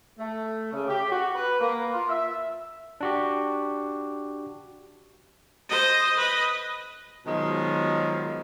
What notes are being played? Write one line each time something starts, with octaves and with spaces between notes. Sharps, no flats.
A3
C#3
G4
F#4
B4
A#3
F4
E5
D4 F#4 G4
C5 D#5
B4 D#5
B2 D#3 F3 F#3 G#3